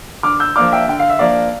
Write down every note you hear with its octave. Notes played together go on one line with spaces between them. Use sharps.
D3 D6 F6
E6 G6
F3 A#3 D4 D6 F6
E5 G5
D3 G5
F5
E5
F3 A#3 D4 D5 F5